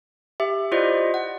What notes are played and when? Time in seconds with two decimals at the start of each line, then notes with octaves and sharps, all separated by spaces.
0.40 G4 E5
0.72 E4 F4 G4 C5 D5 D#5
1.14 F#5